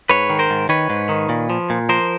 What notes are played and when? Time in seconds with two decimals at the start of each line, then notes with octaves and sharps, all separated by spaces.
0.10 G#2 B4 C#5
0.30 D#3
0.39 A#4 C5
0.50 G#2
0.69 D#3 B4 C#5
0.90 G#2
1.09 D#3
1.29 A#2
1.50 F3
1.70 A#2
1.89 F3 A#4 C5